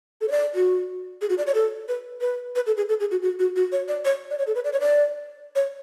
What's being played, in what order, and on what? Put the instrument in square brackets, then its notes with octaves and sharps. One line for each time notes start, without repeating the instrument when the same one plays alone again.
[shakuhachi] A4
C#5
D5
F#4
G#4
F#4
D5
C#5
A4
B4
B4
B4
A4
G#4
A4
G#4
F#4
F#4
F#4
F#4
C#5
D5
C#5
D5
C#5
A4
B4
D5
C#5
D5
C#5